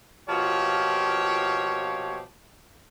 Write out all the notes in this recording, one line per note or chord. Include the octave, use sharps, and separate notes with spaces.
B2 F3 A#3 F4 G4 C#5